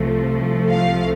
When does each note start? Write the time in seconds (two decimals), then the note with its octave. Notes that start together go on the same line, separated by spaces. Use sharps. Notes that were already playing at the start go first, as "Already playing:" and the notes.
Already playing: C2 C3 F3 A3
0.68 F5